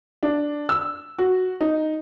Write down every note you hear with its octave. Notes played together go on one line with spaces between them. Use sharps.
D4
E6
F#4
D#4